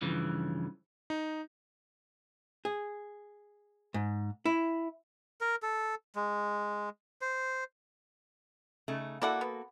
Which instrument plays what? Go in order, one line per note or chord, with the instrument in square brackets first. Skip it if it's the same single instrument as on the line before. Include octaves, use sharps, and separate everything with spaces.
[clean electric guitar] G2 C#3 E3 F3
[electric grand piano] D#4
[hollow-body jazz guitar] G#4
G#2
E4
[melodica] A#4
A4
G#3
C5
[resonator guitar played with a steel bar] C#3 A3 D#4
[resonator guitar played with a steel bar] A#3 F#4 A4 [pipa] E4 D5 F#5
[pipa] B3